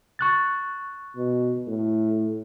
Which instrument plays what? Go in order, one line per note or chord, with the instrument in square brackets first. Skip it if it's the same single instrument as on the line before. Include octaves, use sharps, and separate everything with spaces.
[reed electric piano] C#6 F#6 A6
[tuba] B2
A2